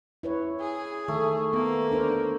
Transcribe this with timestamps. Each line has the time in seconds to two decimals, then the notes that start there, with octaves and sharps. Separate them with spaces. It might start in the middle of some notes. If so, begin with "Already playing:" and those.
0.23 E4 B4 C#5
0.60 G#4
1.08 D#3 A3
1.53 A#3 B3
1.91 D4 A#4 C5